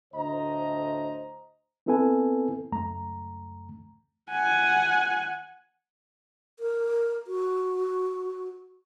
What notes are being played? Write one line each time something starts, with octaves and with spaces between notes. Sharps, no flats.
D2 A2 C5 D#5 A#5
B3 C4 E4 A4 B4 G#5
C#2 F#2 A3 A#5
F#5 G#5
A#4
F#4